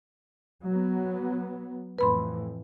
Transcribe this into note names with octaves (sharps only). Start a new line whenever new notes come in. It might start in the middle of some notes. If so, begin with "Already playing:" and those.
F#3 B3
F2 A2 E3 B4 B5 C6